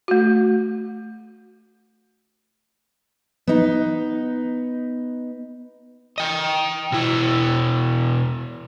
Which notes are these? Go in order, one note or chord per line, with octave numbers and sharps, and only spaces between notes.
A3 F#4
B3 D#4
D#5 G5
B2 E4